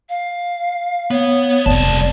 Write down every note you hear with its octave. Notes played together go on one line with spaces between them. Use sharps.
F5
B3 C#5
F1 C2 D5 A5